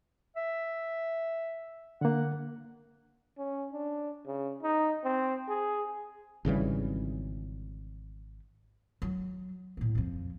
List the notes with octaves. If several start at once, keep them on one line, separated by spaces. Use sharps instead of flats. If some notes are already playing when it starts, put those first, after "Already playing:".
E5
D3 A#3 F#5
C#4
D4
C#3
D#4
C4
G#4
G#1 C#3 E3 G3
F#3
A2 A#3
F2 F3